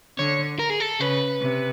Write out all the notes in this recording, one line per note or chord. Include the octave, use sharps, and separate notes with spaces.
D3 C#5
A#4
G#4
A4
C#3 B4
C3